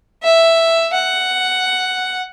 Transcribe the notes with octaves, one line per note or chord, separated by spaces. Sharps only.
E5
F#5